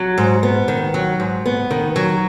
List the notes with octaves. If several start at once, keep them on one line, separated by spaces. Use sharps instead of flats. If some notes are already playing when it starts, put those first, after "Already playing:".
Already playing: F#3
G#2
B3
D#3
F#3
G#2
B3
D#3
F#3